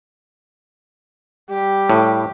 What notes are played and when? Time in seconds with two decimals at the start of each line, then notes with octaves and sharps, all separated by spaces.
1.50 G3 G4
1.89 A2